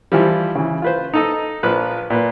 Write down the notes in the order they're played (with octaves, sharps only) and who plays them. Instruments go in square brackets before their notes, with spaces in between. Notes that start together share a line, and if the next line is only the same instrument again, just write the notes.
[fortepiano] E3 F3 G3
C#3 E3
F4 B4 C5
D#4 A4 D#5
A#1 F3 B4 F5
A#2 B4